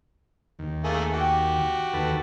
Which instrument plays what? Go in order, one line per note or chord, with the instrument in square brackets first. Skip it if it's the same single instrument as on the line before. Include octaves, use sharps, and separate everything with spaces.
[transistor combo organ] D#2
[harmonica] A3 A#3 G#4
F#4 G4
[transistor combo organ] D#2 A4 B4